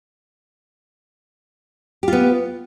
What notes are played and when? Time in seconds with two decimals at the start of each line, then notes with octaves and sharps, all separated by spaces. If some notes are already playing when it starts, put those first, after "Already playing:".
2.03 G4
2.08 F4
2.13 B3